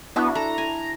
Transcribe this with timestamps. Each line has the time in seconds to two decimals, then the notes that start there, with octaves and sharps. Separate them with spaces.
0.16 B3 D4 E4 F#4
0.35 A4 A#5
0.58 G#5